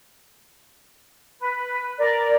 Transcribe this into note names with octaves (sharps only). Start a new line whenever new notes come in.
B4
A#4 D5